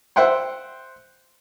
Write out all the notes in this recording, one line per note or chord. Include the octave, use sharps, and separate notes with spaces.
C5 E5 F#5 G5 C6